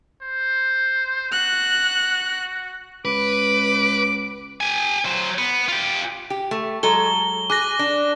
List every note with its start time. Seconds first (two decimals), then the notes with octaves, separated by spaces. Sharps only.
0.22 C5
1.32 F#4 F#6
3.05 C#2 B4 D6
4.61 G4 G#5
5.05 F#3 C5
5.39 B3
5.68 F4 G4
6.30 G4
6.51 A3
6.83 F#3 G#3 A4 G7
7.50 G#4 D6 F#6 A#6
7.79 D4